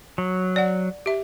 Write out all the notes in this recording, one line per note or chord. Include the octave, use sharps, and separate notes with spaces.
F#3
D5 F#5
G4 E5